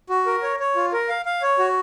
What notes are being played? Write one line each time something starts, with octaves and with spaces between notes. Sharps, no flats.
F#4
A#4
C#5
C#5
F4
A#4
F5
F5
C#5
F#4